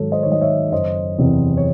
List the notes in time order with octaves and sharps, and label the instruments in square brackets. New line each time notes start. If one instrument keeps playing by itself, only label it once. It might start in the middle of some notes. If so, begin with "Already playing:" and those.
Already playing: [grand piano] G#2 D#3 F#3 A4 C#5
C5 D#5
D#3 C#5
F#3 D#5
C#5 E5
F#1 C5 D#5
E2 C3 E3 C4
C#5